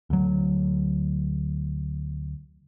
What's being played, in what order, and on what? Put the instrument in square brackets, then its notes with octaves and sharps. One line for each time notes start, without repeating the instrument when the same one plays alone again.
[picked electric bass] D2 F#3